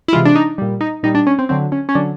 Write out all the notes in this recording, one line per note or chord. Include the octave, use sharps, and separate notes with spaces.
E4
C3 E3 G#3 F4
D4
D#4
A#2 G3
D#4
A#2 G3 D#4
D4
C#4
C4
D3 F#3 C4
C#4
C#4
D3 F#3 D4